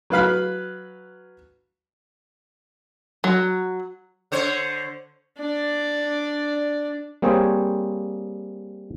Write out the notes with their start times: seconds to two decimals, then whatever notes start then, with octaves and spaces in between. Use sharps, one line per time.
0.10 F#3 B4 F5 B5
3.24 F#3
4.32 D3 C5 C#5
5.38 D4 D5
7.22 G3 A#3 C4 G#4 C5 C#5